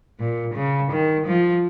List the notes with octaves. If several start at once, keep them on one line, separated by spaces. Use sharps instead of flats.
A#2
C#3
D#3
F3